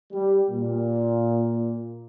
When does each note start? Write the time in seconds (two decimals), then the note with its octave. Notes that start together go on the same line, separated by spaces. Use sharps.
0.12 G3
0.50 A#2